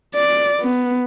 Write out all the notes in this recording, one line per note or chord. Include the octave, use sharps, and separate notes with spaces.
D5
B3